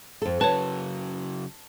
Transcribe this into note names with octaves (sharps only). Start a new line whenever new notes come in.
F2 A4
C#3 F#3 B4 C#5 A5